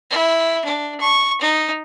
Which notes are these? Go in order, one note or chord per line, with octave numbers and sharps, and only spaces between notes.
E4
D4
C#6
D#4